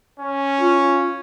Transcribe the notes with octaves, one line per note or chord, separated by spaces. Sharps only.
C#4
F4